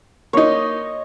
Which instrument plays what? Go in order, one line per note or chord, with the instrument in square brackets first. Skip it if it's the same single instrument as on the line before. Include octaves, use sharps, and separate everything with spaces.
[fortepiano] A#3 D#4 [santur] C#5 D#5